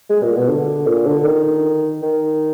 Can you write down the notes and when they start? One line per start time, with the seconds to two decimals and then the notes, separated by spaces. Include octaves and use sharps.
0.10 G#3
0.23 A#2
0.36 B2
0.49 D3
0.87 A#2
1.06 D3
1.25 D#3
2.02 D#3